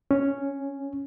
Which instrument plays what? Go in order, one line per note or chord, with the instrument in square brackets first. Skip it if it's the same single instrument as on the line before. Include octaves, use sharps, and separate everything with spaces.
[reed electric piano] C#4